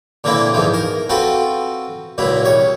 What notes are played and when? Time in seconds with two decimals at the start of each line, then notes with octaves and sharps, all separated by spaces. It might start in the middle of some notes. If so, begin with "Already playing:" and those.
0.24 A#2 D3 E3 A#3 C4 E4
0.53 E2 G#2 E3 F3
0.74 A#4
1.09 C4 F4 F#4 A4 B4
2.18 C#2 A#2 F#3 E4
2.45 C2 C#5